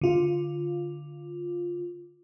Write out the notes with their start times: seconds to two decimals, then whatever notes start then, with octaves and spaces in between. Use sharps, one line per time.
0.01 D3 F4